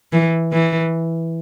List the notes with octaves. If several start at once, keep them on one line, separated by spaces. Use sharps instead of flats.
E3
E3